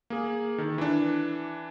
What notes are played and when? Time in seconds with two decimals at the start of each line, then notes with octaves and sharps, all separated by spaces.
0.10 A#3 G#4
0.58 D#3 A4
0.78 E3 D4